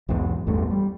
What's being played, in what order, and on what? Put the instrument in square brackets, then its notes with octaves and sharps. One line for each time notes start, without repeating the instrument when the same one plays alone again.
[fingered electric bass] B1 E2 G#2 E3
A1 E2 G2 A3
G3